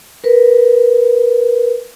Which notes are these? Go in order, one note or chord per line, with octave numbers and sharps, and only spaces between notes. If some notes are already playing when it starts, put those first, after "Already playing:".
A#4 B4